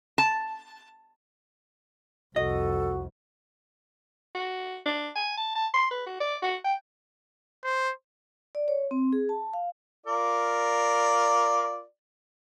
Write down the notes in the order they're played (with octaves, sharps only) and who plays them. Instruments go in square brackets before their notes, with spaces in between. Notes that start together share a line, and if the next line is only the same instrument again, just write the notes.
[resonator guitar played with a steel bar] A5
[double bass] C2 F2 [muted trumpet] F#4 [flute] A4 [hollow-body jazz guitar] D#5
[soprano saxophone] F#4
D4
G#5
A5
A5
C6
B4
F#4
D5
F#4
G5
[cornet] C5
[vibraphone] D5
C#5
C4
G#4
A5
F5
[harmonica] F4 A#4 D5